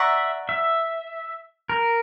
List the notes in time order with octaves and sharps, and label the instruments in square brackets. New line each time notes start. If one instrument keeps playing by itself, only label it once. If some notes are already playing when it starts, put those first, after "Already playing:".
Already playing: [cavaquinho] D5 F#5 A#5 C#6 [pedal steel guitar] E5
[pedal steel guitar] E5
A#4